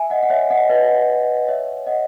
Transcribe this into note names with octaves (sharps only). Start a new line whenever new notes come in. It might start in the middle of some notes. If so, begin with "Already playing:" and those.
Already playing: E5 G#5
D#5 F#5
F#5
C#5 E5
D#5 F#5
B4 D#5
C#5 E5
D#5 F#5